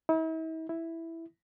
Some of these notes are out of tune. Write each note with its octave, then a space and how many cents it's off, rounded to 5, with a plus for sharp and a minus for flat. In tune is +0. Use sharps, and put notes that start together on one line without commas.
E4 -45
E4 +0